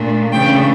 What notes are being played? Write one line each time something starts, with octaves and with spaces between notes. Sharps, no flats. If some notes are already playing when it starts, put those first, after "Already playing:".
Already playing: A#2 A3 D4
C#3 E3 A3 D4 G5